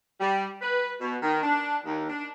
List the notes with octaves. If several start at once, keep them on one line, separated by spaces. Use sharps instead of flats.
G3
B4
B2
D#3
D4
D#2
D4